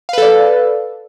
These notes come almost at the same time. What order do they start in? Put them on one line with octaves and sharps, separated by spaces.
F5 B4 A4 D5